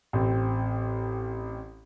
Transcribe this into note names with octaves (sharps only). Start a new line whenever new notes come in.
A1 C4